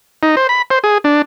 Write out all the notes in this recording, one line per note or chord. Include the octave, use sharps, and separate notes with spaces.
D#4
C5
B5
C5
G#4
D4